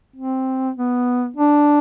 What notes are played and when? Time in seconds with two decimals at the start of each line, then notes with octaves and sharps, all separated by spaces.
0.16 C4
0.76 B3
1.36 D4